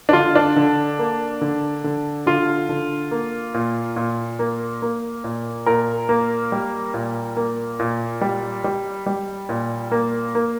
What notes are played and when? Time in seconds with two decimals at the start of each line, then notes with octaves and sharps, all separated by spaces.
0.09 D4
0.13 D3 F4
0.35 D4
0.56 D3
0.99 A#3
1.41 D3
1.84 D3
2.26 D3 F4
2.69 D3
3.11 A#3
3.54 A#2
3.96 A#2
4.39 A#3
4.82 A#3
5.24 A#2
5.66 A#2 A#4
6.09 A#3
6.52 G3
6.94 A#2
7.37 A#3
7.79 A#2
8.21 G3
8.64 G3
9.06 G3
9.49 A#2
9.91 A#3
10.35 A#3